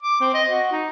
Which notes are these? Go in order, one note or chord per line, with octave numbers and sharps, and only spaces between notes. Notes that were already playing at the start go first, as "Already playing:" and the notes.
D6
C4
D#5
F#4
D#4